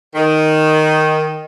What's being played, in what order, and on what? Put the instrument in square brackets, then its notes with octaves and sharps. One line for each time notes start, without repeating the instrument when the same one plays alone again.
[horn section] D#3